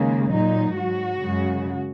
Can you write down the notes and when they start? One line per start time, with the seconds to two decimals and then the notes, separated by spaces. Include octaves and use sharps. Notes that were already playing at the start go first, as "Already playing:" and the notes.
Already playing: D#2 C#3 G#3 A#3
0.30 A#2 F#3 D#4
0.76 G#2 F#3 F#4
1.22 F#2 C#3 G#3